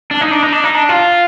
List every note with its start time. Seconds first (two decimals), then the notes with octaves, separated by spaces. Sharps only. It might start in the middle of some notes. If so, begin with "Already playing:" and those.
0.11 D4
0.21 D#4
0.31 D4
0.43 D#4
0.53 D4
0.64 D#4
0.74 D4
0.89 F4